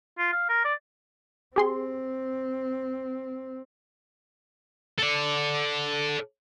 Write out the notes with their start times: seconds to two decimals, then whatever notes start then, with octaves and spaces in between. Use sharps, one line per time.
0.18 F4
0.32 F5
0.49 A#4
0.65 D5
1.56 C4 G4 G#4 C6
4.98 A4 D5